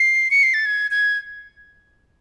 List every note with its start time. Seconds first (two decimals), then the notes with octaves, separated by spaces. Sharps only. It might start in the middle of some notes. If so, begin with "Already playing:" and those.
Already playing: C7
0.31 C#7
0.43 C7
0.54 A6
0.66 G#6
0.91 G#6